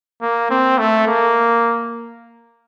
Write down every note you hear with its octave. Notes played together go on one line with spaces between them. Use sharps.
A#3
C4
A3
A#3